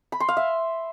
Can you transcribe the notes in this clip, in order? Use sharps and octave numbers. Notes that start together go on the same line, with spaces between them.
B5
C6
F5
E5